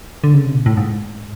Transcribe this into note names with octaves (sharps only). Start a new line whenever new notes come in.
D3
C#3
C3
B2
A2
G#2